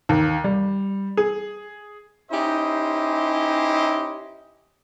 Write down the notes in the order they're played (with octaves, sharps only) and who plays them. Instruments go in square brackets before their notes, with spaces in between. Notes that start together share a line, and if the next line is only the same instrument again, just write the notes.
[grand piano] D#2
G3
G#4
[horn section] C#4 D#4 E4 G4 C5 D#5